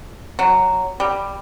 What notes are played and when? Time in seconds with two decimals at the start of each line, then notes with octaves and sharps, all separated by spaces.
0.39 F#3
1.00 G3